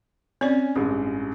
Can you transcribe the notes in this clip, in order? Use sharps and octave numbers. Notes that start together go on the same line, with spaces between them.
C4 C#4 D5
A1 G2 G#3